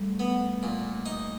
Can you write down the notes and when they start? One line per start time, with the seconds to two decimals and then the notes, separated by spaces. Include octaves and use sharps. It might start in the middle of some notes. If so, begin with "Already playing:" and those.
Already playing: G3 A3
0.20 B3
0.63 A#2
1.06 D#4